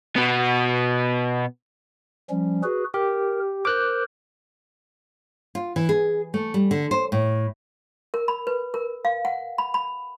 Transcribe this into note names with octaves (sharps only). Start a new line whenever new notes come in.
B2 B3
F3 G3 C#4
F#4 G#4 B4
G4 A#4
A#4 C5 D6 F#6 G6
F4
E3
G#4
A3
G3
D3
C5
A2
A#4
B5
B4
A#4
F5
F#5
B5
B5